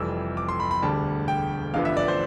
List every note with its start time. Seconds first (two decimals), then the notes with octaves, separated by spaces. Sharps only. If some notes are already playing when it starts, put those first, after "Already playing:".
Already playing: F1 F2 E3 G3 E6
0.37 D6
0.48 C6
0.60 B5
0.71 B5
0.82 E1 D2 D3 G3 A5
1.28 G5
1.74 A1 G2 D3 F3 B3 F5
1.85 E5
1.97 D5
2.08 C5